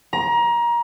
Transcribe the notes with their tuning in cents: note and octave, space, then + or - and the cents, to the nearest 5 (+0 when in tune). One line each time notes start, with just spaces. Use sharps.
A#5 +25